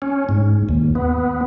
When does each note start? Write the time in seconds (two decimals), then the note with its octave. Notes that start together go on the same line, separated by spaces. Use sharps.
0.02 C#4
0.29 G#2
0.69 D#2
0.95 B3